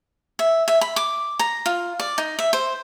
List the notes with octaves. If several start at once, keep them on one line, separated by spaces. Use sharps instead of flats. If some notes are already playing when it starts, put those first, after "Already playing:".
E5
E5
B5
D6
A#5
F4
D5
D#4
E5
C5